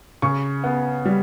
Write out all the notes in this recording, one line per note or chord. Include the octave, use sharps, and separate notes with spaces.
C#3 C#6
B3
G3